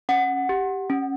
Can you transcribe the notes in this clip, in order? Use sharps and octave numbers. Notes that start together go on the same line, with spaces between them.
C#4 F#5
G4
C#4